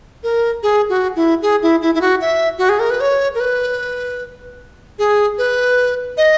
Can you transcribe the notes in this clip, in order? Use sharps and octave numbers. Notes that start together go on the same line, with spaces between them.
A#4
G#4
F#4
E4
G#4
E4
E4
E4
F#4
E5
F#4
G#4
A#4
B4
C#5
A#4
B4
G#4
B4
D#5